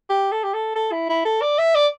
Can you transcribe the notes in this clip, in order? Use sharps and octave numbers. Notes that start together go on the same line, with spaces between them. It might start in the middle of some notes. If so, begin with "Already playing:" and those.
G4
A4
G4
A4
A4
E4
E4
A4
D5
E5
D5